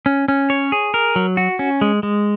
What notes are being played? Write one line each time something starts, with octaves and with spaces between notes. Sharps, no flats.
C#4
C#4
C#5
G#4
A#4
F#3
F#4
C#4
G#3
G#3